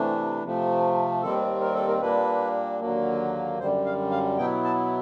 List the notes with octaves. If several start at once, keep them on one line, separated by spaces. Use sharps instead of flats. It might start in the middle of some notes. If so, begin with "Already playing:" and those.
Already playing: C3 E3 A3 D4
C3 F3 A3
D#2 D#3 G3 C4 A4
A#4
A4
A#4
A#2 G3 A#3 D4 B4
D#2 D3 F#3 A#3
F#2 D3 G3 C5
F5
F5
B2 F#3 B3 E4 G5
A5